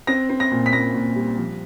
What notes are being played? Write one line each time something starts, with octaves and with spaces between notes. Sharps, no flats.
C4 A#6
C4
A#6
A#2
B6
A#2 A#6
A#2
G3
F3